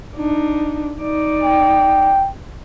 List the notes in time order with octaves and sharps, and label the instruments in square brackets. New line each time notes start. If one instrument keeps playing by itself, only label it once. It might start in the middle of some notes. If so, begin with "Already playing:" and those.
[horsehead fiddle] D4 D#4
D#4 D5
[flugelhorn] G5